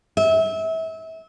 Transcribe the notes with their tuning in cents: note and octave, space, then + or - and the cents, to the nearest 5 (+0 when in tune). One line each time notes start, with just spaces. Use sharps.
E5 -30